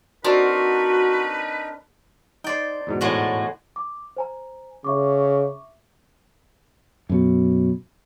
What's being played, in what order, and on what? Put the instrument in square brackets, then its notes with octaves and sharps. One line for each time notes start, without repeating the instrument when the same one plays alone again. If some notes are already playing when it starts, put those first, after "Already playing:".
[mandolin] C4 D4 A#4 [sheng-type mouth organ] D#4 [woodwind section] F#4 [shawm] B4
[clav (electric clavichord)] D#4 [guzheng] C5 D5 G5
[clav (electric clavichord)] E2 G#2 B2
[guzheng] A2 G#3 F#4
[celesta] D6
C5 G#5 A#5
[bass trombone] C#3 [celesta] E5 C#6 D6
[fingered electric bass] F#2 B2